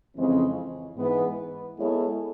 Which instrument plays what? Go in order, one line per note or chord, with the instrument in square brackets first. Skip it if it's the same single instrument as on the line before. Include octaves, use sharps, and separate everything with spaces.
[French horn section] F2 C#3 E3 G#3 C4
G#2 E3 G#3 B3
G#3 B3 E4 A4 C#5